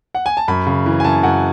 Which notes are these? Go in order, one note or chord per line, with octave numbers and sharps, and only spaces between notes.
F#5
G#5
A5
F#2 B5
C#3
E3
G#5
F#2 A5
F#2 F#5